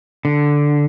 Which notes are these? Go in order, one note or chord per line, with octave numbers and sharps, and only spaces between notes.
D3